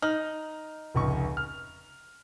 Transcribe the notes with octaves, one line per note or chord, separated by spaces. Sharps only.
D#4 F6 F#7
F1 C#2 C#6
F6